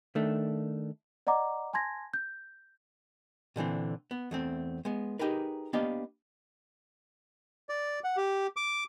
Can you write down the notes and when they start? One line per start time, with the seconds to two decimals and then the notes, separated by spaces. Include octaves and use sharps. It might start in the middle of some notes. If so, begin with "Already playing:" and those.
0.15 D#3 A3 D4
1.27 D5 D#5 F#5 A#5 D6
1.73 G#5 A5 C6 G#6 A#6
2.14 G6
3.56 A#2 D3 E3 C4
4.11 B3
4.31 E2 A3 C4
4.85 G#3 B3
5.19 D#4 G4 G#4 A#4 B4
5.73 A#3 B3 D4 G4 D#5 F5
7.69 D5
8.04 F#5
8.17 G4
8.56 D6